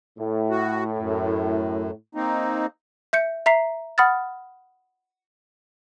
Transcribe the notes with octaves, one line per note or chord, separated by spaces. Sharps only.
A2
F#4
F#2
A#3 C4 D#4
E5 G6 C#7
E5 A#5 B6 C7
F#5 B5 D#6 F6 A6